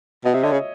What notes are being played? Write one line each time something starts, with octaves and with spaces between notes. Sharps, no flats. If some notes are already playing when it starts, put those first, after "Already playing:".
B2 D#5
C3 E5
D3 C#5 D#5
C#3